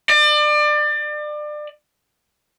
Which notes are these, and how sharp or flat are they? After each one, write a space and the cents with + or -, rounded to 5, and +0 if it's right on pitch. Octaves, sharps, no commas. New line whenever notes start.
D5 +30